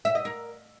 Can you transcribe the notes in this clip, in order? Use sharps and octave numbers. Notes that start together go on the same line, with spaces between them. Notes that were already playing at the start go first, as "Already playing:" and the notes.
E5
D#5
A#4